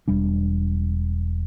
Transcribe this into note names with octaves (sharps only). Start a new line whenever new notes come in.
E1 G3 D4